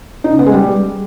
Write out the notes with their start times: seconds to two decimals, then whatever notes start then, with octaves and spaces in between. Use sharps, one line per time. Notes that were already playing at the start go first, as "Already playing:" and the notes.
0.24 D#4
0.32 C#3
0.39 B3
0.46 G#3
0.54 G3